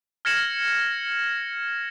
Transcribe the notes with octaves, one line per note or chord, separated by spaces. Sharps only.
F6 G#6 A#6 C#7 E7 F#7